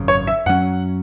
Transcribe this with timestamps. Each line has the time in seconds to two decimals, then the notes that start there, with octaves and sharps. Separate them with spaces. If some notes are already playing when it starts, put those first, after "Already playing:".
Already playing: G#1 F#2 C#3
0.08 C#5
0.27 E5
0.46 F#2 F#3 C#4 F#5